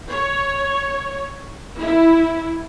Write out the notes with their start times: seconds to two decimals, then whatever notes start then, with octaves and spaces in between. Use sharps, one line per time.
0.11 C#5
1.80 E4